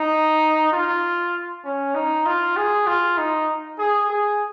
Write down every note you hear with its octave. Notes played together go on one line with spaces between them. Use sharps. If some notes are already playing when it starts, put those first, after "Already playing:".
Already playing: D#4
F4
C#4
D#4
F4
G#4
F4
D#4
G#4
G#4